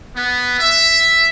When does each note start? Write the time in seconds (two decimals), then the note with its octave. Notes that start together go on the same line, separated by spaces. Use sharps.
0.17 B3
0.60 E5